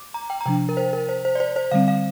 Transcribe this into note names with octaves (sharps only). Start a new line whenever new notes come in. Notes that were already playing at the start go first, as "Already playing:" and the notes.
Already playing: D6
A#5
G5
A#5
C3 F3 D4 G5
A#4
C5
A#4
C5
C5
D5
C5
C5
D3 G3 C4 F5
F5